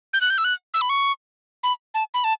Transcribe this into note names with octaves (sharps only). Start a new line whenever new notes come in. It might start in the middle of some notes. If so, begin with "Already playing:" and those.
G6
F#6
G6
E6
F#6
E6
B5
C#6
B5
A5
B5
A5